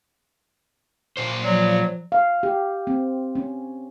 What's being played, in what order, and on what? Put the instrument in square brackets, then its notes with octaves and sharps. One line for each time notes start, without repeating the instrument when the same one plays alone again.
[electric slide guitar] A#2 C5
[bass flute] F3 [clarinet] F#3 [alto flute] D5
[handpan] F5
G4
C4
C#4